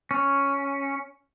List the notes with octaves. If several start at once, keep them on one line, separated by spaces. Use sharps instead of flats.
C#4